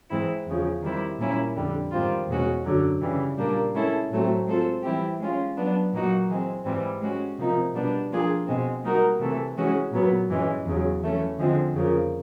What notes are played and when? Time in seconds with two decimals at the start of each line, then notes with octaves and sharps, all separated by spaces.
0.10 G#2 E3 G#3 C4 E4
0.46 E2 C#3 F3
0.82 D#3 G3 C4 E4
1.19 A#2 G3 A#3 C#4 E4
1.55 F2 D3 G3
1.91 G#2 D#3 G3 C4 F4
2.27 E2 B2 G#3 C#4 F#4
2.64 F#2 D3 F#3
3.00 C#3 E3 G3
3.37 A#2 G3 A#3 D4
3.74 G#3 C#4 E4 A4
4.10 A2 F#3 A3 C4
4.46 G#3 C4 F4 A4 C5
4.82 E3 G3 C4 E4 G4
5.20 G#3 C#4 F4
5.56 F#3 B3 D4
5.92 A#2 F#3 A#3 D#4 F#4
6.28 E3 G#3 C4
6.64 G#2 E3 G3 C4
7.01 G#3 C#4 F#4
7.38 C3 F3 A#3 D#4
7.74 B2 G3 B3 D4
8.10 F3 A#3 D4 F4 G#4
8.47 B2 G#3 C4
8.84 G3 A#3 D#4 F#4 A#4
9.19 C3 E3 A3
9.57 E3 G#3 C#4 F#4
9.92 A#2 F#3 B3
10.29 G2 E3 G#3 C#4
10.65 E2 C#3 F#3
11.02 E3 A3 C#4
11.38 D3 F3 G#3 C4
11.74 F2 C#3 F3 A#3